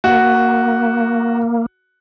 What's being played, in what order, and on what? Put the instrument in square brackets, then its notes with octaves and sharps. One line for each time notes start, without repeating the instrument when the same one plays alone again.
[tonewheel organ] A#3 [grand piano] F#4